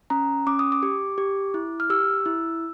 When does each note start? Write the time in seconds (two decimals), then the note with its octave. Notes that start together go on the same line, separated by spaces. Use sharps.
0.10 C#4 A#5
0.46 C#4 D6
0.59 D#6
0.72 D6
0.83 G4
1.18 G4
1.54 E4
1.80 F6
1.90 G4 E6
2.26 E4